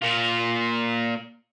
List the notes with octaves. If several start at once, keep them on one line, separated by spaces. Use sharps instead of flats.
A#2 F4